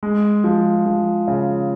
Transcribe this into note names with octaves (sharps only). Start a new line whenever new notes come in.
G#3
F3
F3
C#3